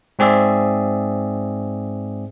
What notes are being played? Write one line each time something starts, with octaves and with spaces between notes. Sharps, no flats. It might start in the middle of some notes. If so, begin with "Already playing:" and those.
G#2 C4 G#4 D5 E5